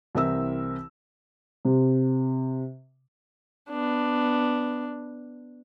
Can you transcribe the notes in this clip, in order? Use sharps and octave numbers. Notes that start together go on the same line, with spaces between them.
C2 E3 C4 A#4 E5 E6
C3
B3 D4